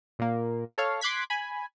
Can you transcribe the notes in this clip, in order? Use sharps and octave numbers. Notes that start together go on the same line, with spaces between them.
A#2 A#3
A4 C#5 F5
C6 D6 F#6 G#6 B6
G#5 B5